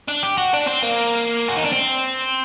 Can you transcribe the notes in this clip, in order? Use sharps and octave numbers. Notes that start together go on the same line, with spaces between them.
D4
G4
F#4
D4
C4
A#3
F#4
D#4
D4
C4